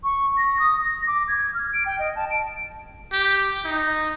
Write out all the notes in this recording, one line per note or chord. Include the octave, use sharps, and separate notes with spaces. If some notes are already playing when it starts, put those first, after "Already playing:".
C#6
A#6
D#6
A#6
D6
G#6
F6
D7
G5
D#5
A5
D7
G4
D#4